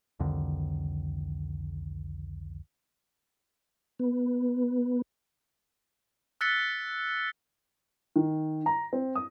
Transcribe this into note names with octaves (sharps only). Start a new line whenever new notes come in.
C2 F2 D3 D#3
B3
E6 F#6 A6 B6 C#7 G7
D#3
A#5
C4
D#6